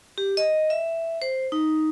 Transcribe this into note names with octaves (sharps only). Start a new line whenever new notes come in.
G4
D#5
E5
C5
D#4